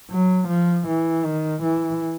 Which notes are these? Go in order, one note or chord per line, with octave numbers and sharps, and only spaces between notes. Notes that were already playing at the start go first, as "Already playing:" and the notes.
F#3
F3
E3
D#3
E3